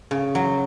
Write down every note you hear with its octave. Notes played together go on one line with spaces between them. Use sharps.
C#3
F#3